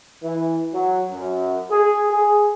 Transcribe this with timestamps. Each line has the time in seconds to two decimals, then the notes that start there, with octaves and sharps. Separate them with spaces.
0.23 E3
0.73 F#3
1.11 F#2
1.71 G#4
2.11 G#4